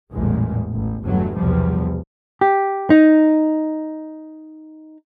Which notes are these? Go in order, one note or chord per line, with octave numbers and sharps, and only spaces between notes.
A1 E2 A#2 G3 G#3
A1
G1 E2 G2 B2 F#3 A3
B1 E2 C3 F3 G3
G4
D#4